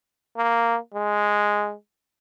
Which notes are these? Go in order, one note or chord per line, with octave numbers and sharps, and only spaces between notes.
A#3
G#3